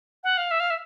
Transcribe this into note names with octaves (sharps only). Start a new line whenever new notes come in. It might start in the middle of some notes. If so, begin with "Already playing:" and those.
F#5
F5
E5
F5
E5